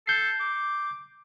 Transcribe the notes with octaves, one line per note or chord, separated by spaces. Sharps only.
A4 G6 C7
D6